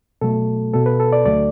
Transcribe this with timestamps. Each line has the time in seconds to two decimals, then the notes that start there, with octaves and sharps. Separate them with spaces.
0.21 B2 F#3 A3 A4
0.73 B2 B3 A4
0.86 B4
1.00 A4
1.13 D5
1.25 D2 D3 F#3 A3 D5